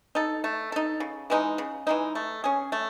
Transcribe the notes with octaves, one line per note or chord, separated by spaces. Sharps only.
D#4 A4
A3
D#4 A4
C#3
E3 G#3 D#4
C#3
E3 G#3 D#4
A3
C#4 G#4
A3